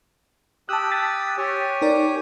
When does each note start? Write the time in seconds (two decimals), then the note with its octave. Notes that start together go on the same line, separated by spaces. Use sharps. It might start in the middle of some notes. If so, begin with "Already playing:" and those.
0.69 G4 A5 D#6 E6 F#6
0.91 F#6 A6 B6
1.38 G4 C#5 G#5
1.82 D#4 A#4 D5